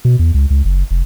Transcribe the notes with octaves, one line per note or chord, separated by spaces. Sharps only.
B2
E2
C#2
C#2
F#1
F1